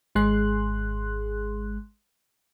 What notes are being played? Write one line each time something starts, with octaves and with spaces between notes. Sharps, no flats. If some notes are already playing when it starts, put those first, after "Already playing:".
G#1 G#3 G#4 C6 F#6